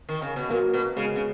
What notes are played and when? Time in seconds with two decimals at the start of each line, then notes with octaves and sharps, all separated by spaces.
0.09 D#3
0.22 C#3
0.36 B2
0.50 A#2 F#3 A#3
0.73 B2
0.96 C#3 G#3 B3
1.16 C#3